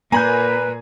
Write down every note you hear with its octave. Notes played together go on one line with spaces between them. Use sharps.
A#2 A#3 B4 G#5 A#5 B5 G6